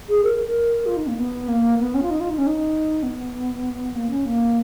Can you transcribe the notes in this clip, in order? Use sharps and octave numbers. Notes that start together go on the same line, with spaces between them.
G#4
A#4
A#4
F4
D#4
A#3
B3
A#3
B3
C#4
F4
D#4
F4
D#4
C#4
D#4
B3
A#3
C#4
A#3